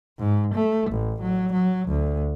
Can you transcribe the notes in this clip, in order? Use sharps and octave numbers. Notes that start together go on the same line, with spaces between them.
G#2
A3
A1
F#3
F#3
D2